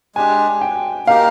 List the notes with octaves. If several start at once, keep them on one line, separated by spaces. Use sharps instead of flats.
G#3 D4 G4 G#5
G5
A#3 D#4 G4 A#4 F5